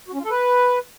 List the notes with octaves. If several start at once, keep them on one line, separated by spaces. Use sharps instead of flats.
F#4
C#4
F4
A4
B4